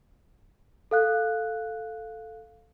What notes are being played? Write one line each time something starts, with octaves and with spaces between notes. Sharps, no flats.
A4 F5 F#6